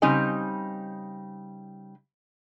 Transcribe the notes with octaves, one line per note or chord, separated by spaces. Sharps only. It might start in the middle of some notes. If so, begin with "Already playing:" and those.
C#3 G3 C4 D#4 D#5 G#5